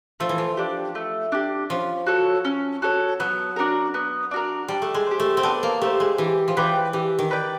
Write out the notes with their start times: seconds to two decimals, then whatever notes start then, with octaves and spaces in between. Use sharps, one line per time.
0.20 F3 A3
0.29 E3
0.38 F3
0.57 D4 G4
0.95 A3
1.32 D4 G4
1.70 F3 C#4
2.07 F#4 A4 C#5
2.45 C#4
2.82 F#4 A4 C#5
3.20 F#3 B3
3.56 D4 F#4 A#4
3.94 B3
4.31 D4 F#4 A#4
4.68 G3 D4
4.82 A3
4.94 G#3
5.06 G4 C5
5.20 A3
5.37 C4
5.43 B3 D4
5.63 A#3
5.81 A3 G4 C5
6.00 G#3
6.18 E3 G4
6.48 F3
6.57 E3 B4 D5 G5
6.93 E3 G4
7.19 D#3
7.31 B4 D5 G5